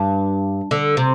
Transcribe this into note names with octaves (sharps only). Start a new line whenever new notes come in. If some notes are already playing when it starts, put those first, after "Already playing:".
Already playing: G2
D3
C3